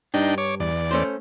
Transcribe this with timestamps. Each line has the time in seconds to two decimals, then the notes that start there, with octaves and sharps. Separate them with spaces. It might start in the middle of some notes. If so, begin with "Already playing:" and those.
0.14 G2 D4 D#4 G5
0.38 C#5 D6
0.60 E2 D5
0.91 A3 C#4 C5